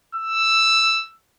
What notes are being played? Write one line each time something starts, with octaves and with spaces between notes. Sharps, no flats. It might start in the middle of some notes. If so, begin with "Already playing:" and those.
E6